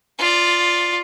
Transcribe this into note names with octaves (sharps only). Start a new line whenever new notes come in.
F4 D5